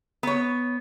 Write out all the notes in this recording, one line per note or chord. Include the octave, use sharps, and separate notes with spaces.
B3 C#5